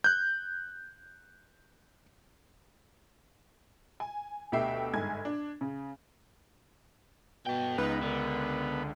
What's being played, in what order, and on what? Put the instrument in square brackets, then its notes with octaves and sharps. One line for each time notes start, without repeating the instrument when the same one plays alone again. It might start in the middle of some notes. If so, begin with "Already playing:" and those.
[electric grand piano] F#6 G6
[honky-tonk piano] G#5
D2 B2 G4 E5 G5 C7
G1 G#2 G#3 G#5 G#6
D4
C#3
[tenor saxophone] B2 [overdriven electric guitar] A4 G5
[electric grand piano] C#2 [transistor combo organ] B3 [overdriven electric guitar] D#4 [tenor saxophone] B4
[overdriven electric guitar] D3 [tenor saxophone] A#4